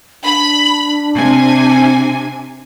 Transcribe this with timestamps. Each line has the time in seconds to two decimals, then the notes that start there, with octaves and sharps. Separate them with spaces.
0.24 D4 B5
1.15 C3 G#5